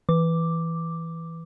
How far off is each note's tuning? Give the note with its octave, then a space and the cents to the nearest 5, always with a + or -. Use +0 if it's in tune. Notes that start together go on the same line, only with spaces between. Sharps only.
E3 +0 D6 +0